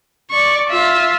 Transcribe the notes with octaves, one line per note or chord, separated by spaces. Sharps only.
D5 C#6
F4 E5